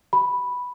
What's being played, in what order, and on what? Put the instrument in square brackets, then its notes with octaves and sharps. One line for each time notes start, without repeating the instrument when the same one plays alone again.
[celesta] B5